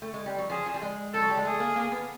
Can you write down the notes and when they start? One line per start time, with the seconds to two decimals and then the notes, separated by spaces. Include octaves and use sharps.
0.02 A3
0.14 G#3
0.26 G3
0.39 F#3
0.49 F3 G#4
0.66 F3
0.74 G3
0.82 G#3
1.13 F3 A4
1.22 F#3
1.29 G3
1.37 G#3
1.45 A3 G#4
1.60 A#3
1.76 A#3
1.92 B3